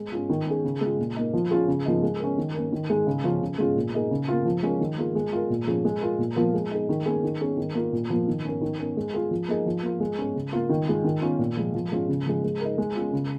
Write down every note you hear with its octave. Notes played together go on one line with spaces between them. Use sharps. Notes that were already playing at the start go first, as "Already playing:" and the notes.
Already playing: G#3
C#4 F4
D#3
C#4 G#4
C#3
G#3 F4
A#2
A#3 D#4
F3
C#4 F4 G#4
C#3
F3 A#3 D#4
G#3
C#4 A#4
D#3
A#3 C#4 A#4
D#3
G#3 D#4 G#4
C#3
F3 C#4 F4
C#3
G#3 C#4 F4 G#4
A#2
A#3 D#4 G#4
C#3
A#3 F4
F3
G#3 C#4 F4 A#4
D#3
A#3 F4 G#4
G#3
F4 A#4
A#2
F3 C#4 G#4
G#3
F4 A#4
A#2
F3 A#3 F4 A#4
G#3
D#4 G#4
D#3
A#3 C#4 G#4
D#3
C#4 G#4
D#3
A#3 F4 A#4
A#2
F3 A#3
D#3
C#4 A#4
D#3
C#4 A#4
G#3
F4 G#4
F3
A#3 D#4 G#4
F3
A#3 F4
G#3
C#4 G#4
C#3
A#3 F4
D#3
G#3 F4
D#3
C#4 F4
A#2
F3 G#3
F3
G#3 C#4 F4
C#3
F3 G#3
G#3
D#4 A#4
G#3
C#4 F4
C#3